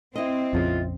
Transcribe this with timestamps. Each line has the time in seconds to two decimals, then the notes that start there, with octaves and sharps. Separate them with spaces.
0.16 C4 E4 D#5
0.53 A#1 F2 C#3 F4